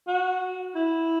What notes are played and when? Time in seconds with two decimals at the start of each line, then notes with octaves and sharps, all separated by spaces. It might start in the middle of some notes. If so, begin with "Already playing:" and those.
0.07 F#4
0.75 E4